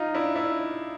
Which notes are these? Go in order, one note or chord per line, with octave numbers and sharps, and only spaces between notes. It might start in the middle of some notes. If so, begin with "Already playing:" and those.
Already playing: D#4 F4
D4 E4
D4 E4